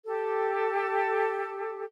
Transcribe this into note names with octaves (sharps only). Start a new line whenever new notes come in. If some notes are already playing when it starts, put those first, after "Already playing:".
G4 A4